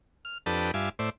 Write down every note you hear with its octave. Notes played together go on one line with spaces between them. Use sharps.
F6
F2 D4 G4 A4 B4 D#6
G2 F4 E5 G#5 D6
A2 C5 D5 E5